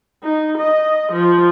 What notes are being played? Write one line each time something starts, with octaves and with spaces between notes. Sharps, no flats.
D#4
D#5
F3